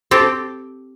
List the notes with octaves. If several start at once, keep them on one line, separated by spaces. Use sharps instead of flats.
C4 G4 A4